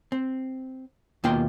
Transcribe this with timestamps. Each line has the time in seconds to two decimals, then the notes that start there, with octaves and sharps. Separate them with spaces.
0.12 C4
1.24 D#2 B2 A#3 F4 G5 C6